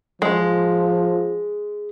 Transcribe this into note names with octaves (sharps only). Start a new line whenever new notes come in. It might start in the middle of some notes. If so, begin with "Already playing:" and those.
F3 G#3